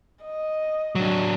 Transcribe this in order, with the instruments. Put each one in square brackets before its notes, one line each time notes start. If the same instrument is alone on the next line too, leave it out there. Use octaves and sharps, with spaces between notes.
[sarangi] D#5
[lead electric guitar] F#3 D4